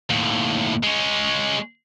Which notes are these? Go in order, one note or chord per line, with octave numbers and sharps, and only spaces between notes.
D#2 A2
G#3 C#4